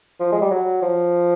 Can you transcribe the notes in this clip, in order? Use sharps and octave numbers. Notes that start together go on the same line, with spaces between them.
F3
G#3
G3
F#3
F3